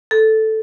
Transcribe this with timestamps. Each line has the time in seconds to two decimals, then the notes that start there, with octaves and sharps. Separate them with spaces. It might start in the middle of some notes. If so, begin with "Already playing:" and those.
0.11 A4